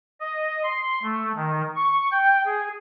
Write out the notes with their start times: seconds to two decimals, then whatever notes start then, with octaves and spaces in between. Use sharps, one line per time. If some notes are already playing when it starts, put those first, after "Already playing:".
0.20 D#5
0.63 C6
1.03 A3
1.36 D#3
1.76 C#6
2.11 G5
2.46 G#4